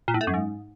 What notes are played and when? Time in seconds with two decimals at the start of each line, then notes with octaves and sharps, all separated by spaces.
0.08 A#2
0.14 A2
0.21 A3
0.27 F#2
0.34 G#2